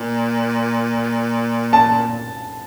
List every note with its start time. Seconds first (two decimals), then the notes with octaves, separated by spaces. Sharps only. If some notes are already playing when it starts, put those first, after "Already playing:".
Already playing: A#2
1.73 A5